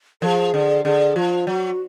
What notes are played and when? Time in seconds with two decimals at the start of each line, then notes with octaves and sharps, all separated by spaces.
0.21 F3 G#4 A#4
0.54 D3
0.85 D3 G#4
1.16 F3 F4
1.47 F#3 F#4